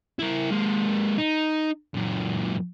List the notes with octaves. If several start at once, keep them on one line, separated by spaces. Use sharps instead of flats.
E4 A#4
G#3 A#3
D#4
F#2 A#2